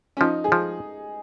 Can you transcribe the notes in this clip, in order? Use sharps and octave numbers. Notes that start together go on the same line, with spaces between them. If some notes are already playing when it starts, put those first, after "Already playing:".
C#4
F3 D#4
G#4
F3